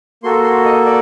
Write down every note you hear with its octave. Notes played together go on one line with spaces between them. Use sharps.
A#3 F#4 A4 C6
C6
D#5
D5